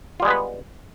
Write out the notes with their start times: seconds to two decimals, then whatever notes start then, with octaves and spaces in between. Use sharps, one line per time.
0.20 F4
0.22 G3
0.25 G#3
0.28 B3
0.30 B4